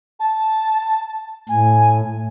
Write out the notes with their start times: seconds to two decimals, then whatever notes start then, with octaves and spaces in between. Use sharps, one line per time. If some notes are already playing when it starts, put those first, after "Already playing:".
0.20 A5
1.49 A2 G#5